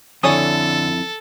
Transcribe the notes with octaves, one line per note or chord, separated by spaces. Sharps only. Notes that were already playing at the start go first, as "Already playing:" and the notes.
F2 D3 D4 E4 A4 C#5 G#5 D#6